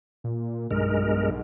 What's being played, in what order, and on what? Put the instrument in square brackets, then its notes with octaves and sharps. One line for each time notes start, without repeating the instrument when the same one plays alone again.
[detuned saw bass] A#2
[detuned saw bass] B1 [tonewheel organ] G2 G#3 A#4